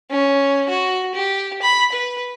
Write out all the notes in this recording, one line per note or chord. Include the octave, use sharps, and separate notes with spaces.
C#4
F#4
G4
B5
B4